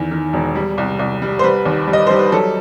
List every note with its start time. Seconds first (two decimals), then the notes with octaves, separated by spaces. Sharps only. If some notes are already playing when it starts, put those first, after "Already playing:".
Already playing: E2 D#3
0.11 D#3
0.33 E1
0.55 G3
0.78 C2
0.99 C2
1.22 G3
1.39 C5
1.43 G3 B4
1.65 D#2
1.88 G3
1.93 D#5
2.07 G3 C5
2.19 B4
2.32 F#3 A4